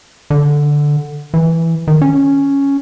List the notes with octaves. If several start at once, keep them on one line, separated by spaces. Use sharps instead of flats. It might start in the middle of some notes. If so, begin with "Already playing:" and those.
D3
E3
D#3
C#4